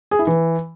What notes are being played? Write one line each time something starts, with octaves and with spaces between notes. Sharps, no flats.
G#4
E4
E3